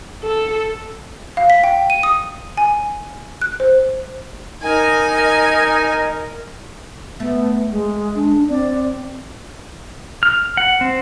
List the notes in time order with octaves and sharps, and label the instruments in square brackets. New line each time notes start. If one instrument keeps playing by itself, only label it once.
[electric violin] A4
[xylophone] F5
B6
G5
D#7
D#6
G#5
F#6
C5
[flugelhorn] D#4 [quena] A#4 [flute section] D#5 [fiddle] G#5
[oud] A3 [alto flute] B3
[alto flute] G#3
[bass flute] D4
[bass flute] C4 [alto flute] D5
[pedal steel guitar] F6
F#5
C4